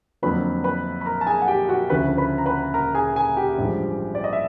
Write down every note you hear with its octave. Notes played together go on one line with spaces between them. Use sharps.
F2 D3 F#3 A#3 B4 B5
B4 B5
B5
A#4 A#5
A5
G#4 G#5
F#5
G4 G5
F#4 F#5
D2 C#3 F3 A3 B4 B5
B4 B5
A#5
B4 B5
A#4 A#5
G#4 G#5
G#4 G#5
G4 G5
A1 G2 D3 F3 G#3
D5
D#5
E5